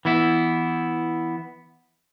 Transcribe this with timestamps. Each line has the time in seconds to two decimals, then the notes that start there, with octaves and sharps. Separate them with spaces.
0.05 E3 B3 E4